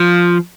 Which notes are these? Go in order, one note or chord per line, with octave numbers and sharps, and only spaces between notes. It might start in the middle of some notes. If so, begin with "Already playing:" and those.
Already playing: F3